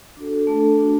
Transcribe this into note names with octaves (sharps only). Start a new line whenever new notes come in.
D4 F#4 A4
A3 D4 A4
A3 D4 F#4